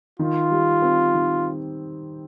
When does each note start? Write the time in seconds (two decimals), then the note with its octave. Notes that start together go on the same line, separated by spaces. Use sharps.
0.19 D#3 F4
0.51 G3
0.82 C4
1.14 D#3